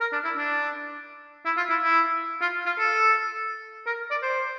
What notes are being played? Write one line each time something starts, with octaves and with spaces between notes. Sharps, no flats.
A#4
D4
E4
D4
E4
F4
E4
E4
F4
F4
A4
A#4
D5
C5